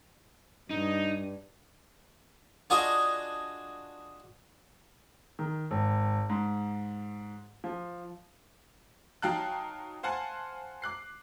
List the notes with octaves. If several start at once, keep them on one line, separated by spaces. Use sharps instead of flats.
G2 D#4
D4 F4 F#4 G#4 D#5
D#3
G#1
G#2
F3
F#3 D#4 F5 G5 A5 F#6
C5 F5 F#5 G#5 A5
D6 F#6 C7